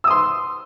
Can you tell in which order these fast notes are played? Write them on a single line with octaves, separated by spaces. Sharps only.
E6 D#6 C6